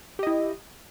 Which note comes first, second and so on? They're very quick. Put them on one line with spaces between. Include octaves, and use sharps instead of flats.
G4 D#5 E4